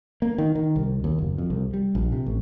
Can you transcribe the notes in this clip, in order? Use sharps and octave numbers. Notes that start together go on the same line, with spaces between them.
A#3
D#3
D#3
C2
D#2
F#1
F2
C2
G3
A#1
C3
A1